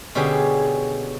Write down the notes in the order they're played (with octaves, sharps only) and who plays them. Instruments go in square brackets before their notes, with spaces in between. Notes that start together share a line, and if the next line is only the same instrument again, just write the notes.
[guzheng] B2 D3 C#4 G4 G#4